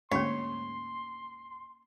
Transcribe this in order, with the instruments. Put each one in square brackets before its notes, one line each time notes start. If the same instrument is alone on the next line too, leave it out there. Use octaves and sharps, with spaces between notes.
[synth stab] D2 G#2 [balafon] A#3 C#4 [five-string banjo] C#5 [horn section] C6